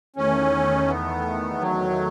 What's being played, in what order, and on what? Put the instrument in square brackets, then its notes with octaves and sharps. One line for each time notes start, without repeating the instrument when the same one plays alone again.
[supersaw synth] E2 D#3 A3 [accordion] C#4
[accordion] B3
F#3